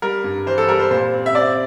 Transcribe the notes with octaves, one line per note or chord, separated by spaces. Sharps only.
G3 A#4
G2
E3 C5
A4
G3 A#4
C5
A#2 C5
C4
E5
C4 D5